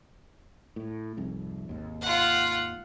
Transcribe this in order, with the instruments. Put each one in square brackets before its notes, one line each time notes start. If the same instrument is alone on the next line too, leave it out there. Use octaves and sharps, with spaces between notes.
[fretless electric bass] A2
C2 F2 G#2
G#1 D#2
[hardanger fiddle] F4 F#5